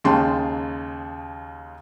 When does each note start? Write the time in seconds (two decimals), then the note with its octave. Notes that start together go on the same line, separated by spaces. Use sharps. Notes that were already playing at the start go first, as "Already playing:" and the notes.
0.04 D#2 C#3 G#3 G5 A5 C6